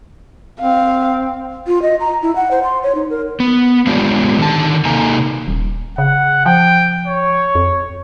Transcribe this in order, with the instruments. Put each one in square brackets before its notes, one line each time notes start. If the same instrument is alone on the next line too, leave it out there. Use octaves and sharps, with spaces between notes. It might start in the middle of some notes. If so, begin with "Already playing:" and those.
[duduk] C4 [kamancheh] F5
[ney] F4
D#5
A#5
E4
F#5
C5
C6
C#5
D#4
A#4
[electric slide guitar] B3
G#3 B3 C#4 D4 F4 G4
D3 D#3 A5
C3 A#3 D#4 A4 G#5 A#5
[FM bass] D#1
[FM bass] C#3 [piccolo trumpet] F#5
[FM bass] F3 [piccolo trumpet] G5
[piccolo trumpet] C#5
[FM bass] F2